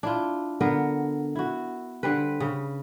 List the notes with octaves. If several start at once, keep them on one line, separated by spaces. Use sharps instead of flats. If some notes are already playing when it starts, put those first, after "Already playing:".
D4 E4 F4
D3 B3 A#4
E4 F#4
D3 G3 C4 B4
C#3